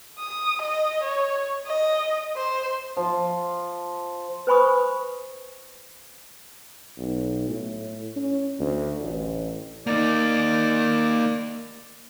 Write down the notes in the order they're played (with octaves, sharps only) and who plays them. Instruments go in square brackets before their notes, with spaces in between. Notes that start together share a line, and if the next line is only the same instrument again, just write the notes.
[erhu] D#6
D#5
C#5
D#5
C5
[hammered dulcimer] F3
[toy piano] B4 C5 G#5 B5 C#6 D#6
[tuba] B1
A2
C#4
D2
A1
[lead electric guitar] A#3 D#4 [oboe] D5